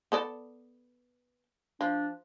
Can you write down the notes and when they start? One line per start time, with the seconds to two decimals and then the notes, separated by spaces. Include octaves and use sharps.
0.12 B3 A4 D5
1.81 F3 D4